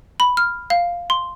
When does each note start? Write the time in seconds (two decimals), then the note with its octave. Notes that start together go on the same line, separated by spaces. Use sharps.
0.20 B5
0.37 F6
0.70 F5
1.10 C6